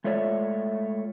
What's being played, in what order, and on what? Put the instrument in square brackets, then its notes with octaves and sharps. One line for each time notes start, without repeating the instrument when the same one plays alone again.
[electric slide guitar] G#3 A3 F4 C#5 D5 E5